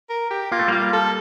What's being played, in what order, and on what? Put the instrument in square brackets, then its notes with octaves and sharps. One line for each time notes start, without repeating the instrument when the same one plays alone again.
[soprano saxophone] A#4
G4
[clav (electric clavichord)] A#3 [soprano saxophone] F4
[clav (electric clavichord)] A3
[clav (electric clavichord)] G3 A#3 [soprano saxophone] F4
[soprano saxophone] A4